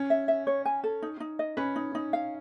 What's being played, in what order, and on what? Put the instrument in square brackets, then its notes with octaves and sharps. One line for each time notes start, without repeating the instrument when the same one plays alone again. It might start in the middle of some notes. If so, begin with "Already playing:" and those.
Already playing: [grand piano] C#4
[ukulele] E5
E5
C#5
G#5
A4
D#4
D#4
D#5
[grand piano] C#4 [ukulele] B4
[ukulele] D#4
D#4
F5